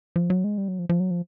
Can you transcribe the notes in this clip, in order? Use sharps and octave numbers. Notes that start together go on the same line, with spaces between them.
F3
F#3
G#3
G3
F#3
F3
F3
F#3
F3